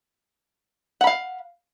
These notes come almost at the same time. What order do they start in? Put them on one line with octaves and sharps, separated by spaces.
F#5 B5 F5